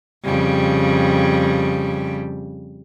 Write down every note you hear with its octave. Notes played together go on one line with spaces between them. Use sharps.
F2 C#3 G3